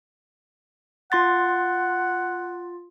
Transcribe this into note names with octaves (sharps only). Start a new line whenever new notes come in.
F4 F#5 C6 A6